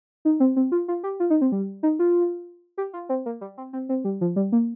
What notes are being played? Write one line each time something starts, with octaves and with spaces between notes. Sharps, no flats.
D#4
C4
C4
F4
F4
G4
F4
D#4
C4
G3
D#4
F4
G4
F4
C4
A#3
G3
C4
C4
C4
G3
F3
G3
A#3